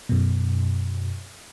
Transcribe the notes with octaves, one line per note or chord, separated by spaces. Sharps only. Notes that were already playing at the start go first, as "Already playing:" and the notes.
F#2 B2